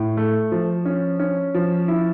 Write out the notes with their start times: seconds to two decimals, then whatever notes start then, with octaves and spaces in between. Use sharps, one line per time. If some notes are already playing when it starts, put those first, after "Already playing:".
Already playing: A2
0.17 A3
0.52 F3
0.85 C#4
1.20 C#4
1.54 F3
1.88 E4